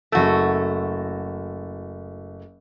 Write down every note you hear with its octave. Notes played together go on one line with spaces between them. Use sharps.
F#1 A3 F#4 E6